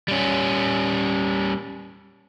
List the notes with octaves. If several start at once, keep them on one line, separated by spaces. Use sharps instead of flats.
G3 C#4